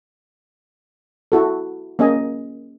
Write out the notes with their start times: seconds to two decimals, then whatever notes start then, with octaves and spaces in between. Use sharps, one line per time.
1.32 E4 F#4 A4
1.99 A#3 C#4 G#4 D#5 G#5